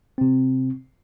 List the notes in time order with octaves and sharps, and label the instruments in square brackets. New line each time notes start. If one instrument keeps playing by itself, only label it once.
[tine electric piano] C3 C4